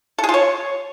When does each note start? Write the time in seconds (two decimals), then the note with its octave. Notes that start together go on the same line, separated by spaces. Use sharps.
0.18 A4
0.24 G#4
0.29 F4
0.34 C#5